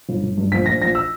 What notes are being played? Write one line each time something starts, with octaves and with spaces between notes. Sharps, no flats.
G1
G1
G2
A#1 B6
A#1 A#6
A#1 A#6
E6